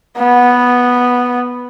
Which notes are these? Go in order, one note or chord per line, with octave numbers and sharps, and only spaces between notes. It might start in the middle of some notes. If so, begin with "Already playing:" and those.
B3